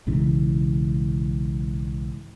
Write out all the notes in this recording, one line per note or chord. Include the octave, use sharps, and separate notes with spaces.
B1 G#2 C#3 E3